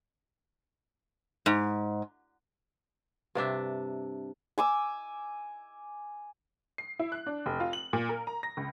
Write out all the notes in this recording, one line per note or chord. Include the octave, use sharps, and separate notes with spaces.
G#2
G2 C3 D4 E5
G#5 D6 E6
C7
E4
F#6
D4
F1
F4
F#7
A#2
A#4
A#5
A#6
C#2